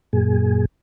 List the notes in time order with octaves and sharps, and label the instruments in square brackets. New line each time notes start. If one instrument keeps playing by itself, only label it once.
[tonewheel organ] F#2 A#2 G#4